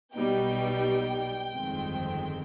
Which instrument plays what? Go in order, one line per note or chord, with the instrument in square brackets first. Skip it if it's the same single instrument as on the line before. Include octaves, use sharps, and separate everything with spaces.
[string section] B1 B2 G3 B3 D#4 G5
G1 F2 D#3 G#3 C4